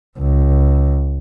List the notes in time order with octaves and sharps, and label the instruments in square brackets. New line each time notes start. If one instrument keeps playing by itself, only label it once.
[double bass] C#2